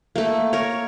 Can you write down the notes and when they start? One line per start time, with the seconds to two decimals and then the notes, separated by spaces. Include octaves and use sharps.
0.16 A3 A#3
0.53 A#4 C#5